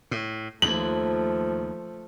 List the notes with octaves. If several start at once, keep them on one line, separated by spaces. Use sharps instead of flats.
A2
D#2 F3 A3 F#7